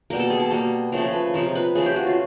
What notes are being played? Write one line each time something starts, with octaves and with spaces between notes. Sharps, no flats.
B2 G3 A#3 A#4
A4
G#4
A4
B2 G3 A#3
C#3 F3 A3 A#4
B4
C3 F3 G#3 A#4
B4
C#3 F3 A3 G#4
G4
F#4
F4